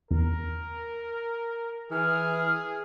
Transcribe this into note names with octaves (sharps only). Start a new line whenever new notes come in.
E2 A#4
E3 G#4 F6